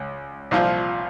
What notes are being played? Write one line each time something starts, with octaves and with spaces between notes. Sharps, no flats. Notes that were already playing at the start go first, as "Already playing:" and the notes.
Already playing: C#2
C2 A#2 F3